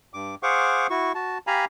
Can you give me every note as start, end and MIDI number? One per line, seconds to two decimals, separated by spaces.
0.14 0.35 43
0.14 0.35 86
0.43 0.87 68
0.43 0.87 72
0.43 0.87 77
0.43 0.87 78
0.43 0.87 85
0.43 0.87 86
0.90 1.12 64
0.90 1.12 66
0.90 1.12 85
1.15 1.38 66
1.15 1.38 81
1.47 1.65 67
1.47 1.65 77
1.47 1.65 80
1.47 1.65 82
1.47 1.65 83